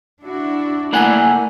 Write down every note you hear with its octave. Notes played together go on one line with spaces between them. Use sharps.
D4 E4 F#4
A3 A#3 E4 D5 F#5 G#5